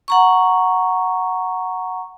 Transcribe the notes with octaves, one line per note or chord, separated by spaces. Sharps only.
F#5 A#5 C#6